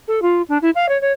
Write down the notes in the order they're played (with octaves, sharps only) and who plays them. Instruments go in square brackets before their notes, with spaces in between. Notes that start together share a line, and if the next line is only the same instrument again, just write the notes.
[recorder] A4
F4
D4
E4
F5
C#5
C#5